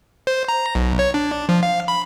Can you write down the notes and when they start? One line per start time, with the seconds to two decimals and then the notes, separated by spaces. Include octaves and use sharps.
0.27 C5
0.48 A#5
0.75 B1
0.99 C#5
1.14 D4
1.49 F3
1.63 F5
1.88 B5